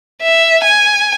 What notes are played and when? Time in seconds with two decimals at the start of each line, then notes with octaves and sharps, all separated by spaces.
0.22 E5
0.64 G#5